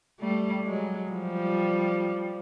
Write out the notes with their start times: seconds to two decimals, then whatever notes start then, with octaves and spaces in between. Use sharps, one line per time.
0.20 G3 A3
0.66 F#3 G#3
1.11 F3 G3